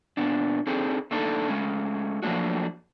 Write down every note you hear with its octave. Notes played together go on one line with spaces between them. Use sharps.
A#2 B3 D4
C4 D4 D#4 G#4 A4
A3 A#3 D4 D#4 A4
G#3 A3 C#4
F3 F#3 A3 A#3 D4 F#4